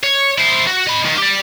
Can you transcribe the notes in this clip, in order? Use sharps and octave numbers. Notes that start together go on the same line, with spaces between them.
C#5
E4 C5
F#4
D#5 B5
D#2
G4 D5